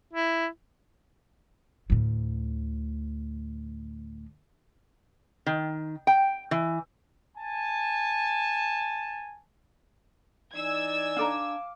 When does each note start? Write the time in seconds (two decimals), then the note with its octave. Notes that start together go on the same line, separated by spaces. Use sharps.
0.13 E4
1.90 D2 A2
5.46 D#3
6.07 G5
6.51 E3
7.37 G#5 A5
10.54 E3 D#4 D5 G#5 E6 G#6
11.17 D4 A4 F5 A#5 D6